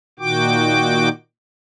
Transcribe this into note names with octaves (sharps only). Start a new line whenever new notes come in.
A#2 D#3 F#4 G5 D6